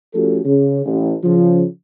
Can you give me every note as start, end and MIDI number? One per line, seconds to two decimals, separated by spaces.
0.14 0.40 53
0.14 0.40 57
0.14 0.40 61
0.14 0.40 66
0.14 0.40 67
0.14 0.40 69
0.45 0.81 49
0.86 1.13 33
1.24 1.64 49
1.24 1.64 53